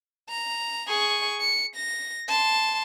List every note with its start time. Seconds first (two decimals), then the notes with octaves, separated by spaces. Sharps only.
0.29 A#5
0.88 G#4 C#6
1.40 C#7
1.76 A#6
2.28 A5 C6